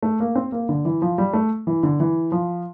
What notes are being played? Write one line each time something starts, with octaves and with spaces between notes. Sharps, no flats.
A3
A#3
C4
A#3
D3
E3
F3
G3
A3
E3
D3
E3
F3